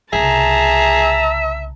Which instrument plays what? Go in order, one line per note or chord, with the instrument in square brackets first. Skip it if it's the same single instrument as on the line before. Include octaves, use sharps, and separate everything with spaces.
[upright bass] C2 C#3 [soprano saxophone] G#4 [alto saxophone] E5 [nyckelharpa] A5 A#5